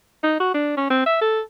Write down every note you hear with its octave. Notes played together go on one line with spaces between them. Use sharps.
D#4
F#4
D4
C#4
C4
E5
A4